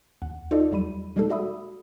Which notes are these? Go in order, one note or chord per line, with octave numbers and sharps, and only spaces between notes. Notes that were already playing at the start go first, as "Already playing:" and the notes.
D#2 F#5
D#4 F4 A4 D5 D#5
E2 F#3 G3 B5 D#7
B2 G3 G#3 A#3 D#4 A4
F#4 D5 E5 B5 D#6